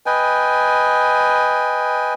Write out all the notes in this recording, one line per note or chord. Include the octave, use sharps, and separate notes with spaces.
B4 D#5 G5 G#5